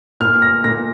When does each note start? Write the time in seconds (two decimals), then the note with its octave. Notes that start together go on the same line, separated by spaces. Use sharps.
0.20 A#2 F6
0.42 A#6
0.64 A#2 A#6